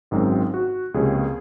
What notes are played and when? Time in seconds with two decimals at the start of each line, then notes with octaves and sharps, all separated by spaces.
0.11 G#1 F#2 D#3 G#3 C4
0.54 F#4
0.94 C#2 C3 F3 A#3 C#4 G#4